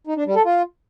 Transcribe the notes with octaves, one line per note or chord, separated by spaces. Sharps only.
D#4
D4
G3
A4
F4